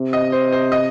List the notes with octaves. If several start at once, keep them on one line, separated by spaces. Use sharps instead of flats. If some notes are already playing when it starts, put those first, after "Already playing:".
Already playing: C3
D#5
C5
C5
D#5